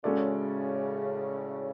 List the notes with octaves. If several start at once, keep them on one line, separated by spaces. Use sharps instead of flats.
A2 C#3 G#3 C#4 F#4 A4 D5